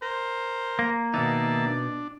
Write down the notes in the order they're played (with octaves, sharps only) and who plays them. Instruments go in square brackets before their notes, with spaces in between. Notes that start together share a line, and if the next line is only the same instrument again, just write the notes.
[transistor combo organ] A#4 [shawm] C5
[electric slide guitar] A#3
[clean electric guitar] B2 B3 D#4 [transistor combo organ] D#3 E5 A5 [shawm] D5
[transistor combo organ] D4